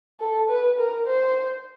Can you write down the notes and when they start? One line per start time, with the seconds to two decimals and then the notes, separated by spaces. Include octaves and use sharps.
0.20 A4
0.49 B4
0.78 A#4
1.06 C5